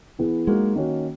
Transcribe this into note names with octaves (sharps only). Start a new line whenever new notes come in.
E3 B3 E4 G#4
F#3 G#3 A#3 D#4 F#4
D#3 A#3 C#4 F#4